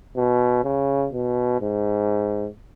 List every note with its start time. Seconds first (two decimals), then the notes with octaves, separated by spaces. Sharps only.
0.16 B2
0.64 C#3
1.13 B2
1.61 G#2